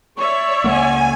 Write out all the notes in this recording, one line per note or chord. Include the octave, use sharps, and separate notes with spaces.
C#5 D5 E5 C#6
C#2 G#3 A#3 F#5 G#5